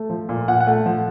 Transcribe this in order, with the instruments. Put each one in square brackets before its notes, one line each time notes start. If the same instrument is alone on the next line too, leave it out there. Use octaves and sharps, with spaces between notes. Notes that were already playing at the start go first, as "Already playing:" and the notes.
Already playing: [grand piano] A3
F3
A#2
A#2 F#5
F#5
A3
F3